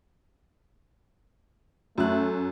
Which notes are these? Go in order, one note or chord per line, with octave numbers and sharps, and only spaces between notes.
F#2 A3 F#6